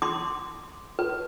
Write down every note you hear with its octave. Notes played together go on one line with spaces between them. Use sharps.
C6 D6
B4